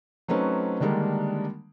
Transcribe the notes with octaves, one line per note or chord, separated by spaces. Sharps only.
F#3 A3 C4 C#4 D#4 B4
D3 D#3 G3 G#3 A#3 D4